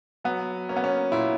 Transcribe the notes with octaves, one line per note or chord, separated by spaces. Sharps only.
F#3 B3
A#3 C#4
B3
C#4
A#2 E4